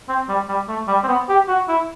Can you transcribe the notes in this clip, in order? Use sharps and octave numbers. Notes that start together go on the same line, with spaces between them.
C4
G3
G3
A3
G3
C4
B3
G4
F#4
E4